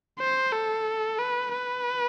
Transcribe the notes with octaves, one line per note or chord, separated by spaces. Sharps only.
C5
A4
B4
B4